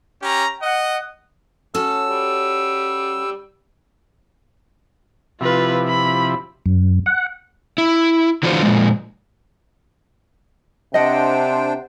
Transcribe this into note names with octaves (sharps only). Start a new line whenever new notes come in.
C#4 G4 A#5
D#5 F#5
C#4 F#4 A4 E6
G3
C3 F3 E4 F4 B4
B5
F#2
F#5
E4
D3 E3 D4 F4 F#4 C5
A#2 C#3 F3 G#3
C3 D4 C5 D#5 F#5 G5